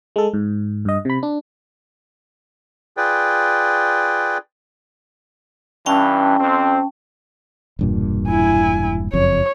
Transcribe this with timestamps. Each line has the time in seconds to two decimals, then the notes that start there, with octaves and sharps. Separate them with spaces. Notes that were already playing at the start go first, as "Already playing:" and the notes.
0.16 G#3 A4
0.34 G#2
0.85 G2 D#5
1.05 C3 B5
1.23 D4
2.97 F4 G#4 B4 D5 G5
5.86 G2 E3 C#4 G5 A5
6.39 F2 C4
7.79 E1 G2 A#2
8.28 E4 G#5
9.13 F#1 F2 C#5